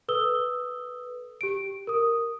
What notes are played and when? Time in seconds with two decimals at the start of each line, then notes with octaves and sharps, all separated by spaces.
0.08 A4 B4 D#6 E6 G7
1.41 G4 D7
1.87 A#4 D#6